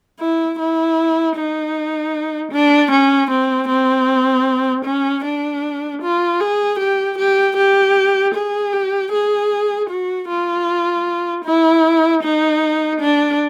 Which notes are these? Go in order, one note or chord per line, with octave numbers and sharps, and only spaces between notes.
E4
E4
D#4
D4
C#4
C4
C4
C#4
D4
F4
G#4
G4
G4
G4
G#4
G4
G#4
F#4
F4
E4
D#4
D4